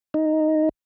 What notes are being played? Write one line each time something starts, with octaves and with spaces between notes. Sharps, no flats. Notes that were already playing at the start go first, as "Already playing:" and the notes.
D#4